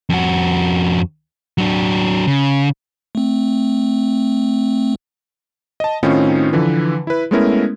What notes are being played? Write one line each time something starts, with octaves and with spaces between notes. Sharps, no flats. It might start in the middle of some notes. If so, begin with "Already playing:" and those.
F2 F#4
F#3 D4
C#3
A3 C4
D#5 A5
A2 D#3 C4 C#4 D#4 F4
D3 E3 F3 B4
E4 B4
G#3 A3 B3 C#4 E4 A#4